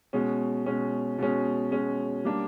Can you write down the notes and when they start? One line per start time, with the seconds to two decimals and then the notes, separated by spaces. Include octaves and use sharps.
0.13 B2 G#3 C#4
0.66 B2 G#3 C#4
1.18 B2 G#3 C#4
1.72 B2 G#3 C#4
2.25 G3 A#3 D4